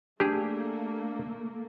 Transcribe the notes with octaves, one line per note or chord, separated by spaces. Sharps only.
A3 A#3 D4 G4 G#4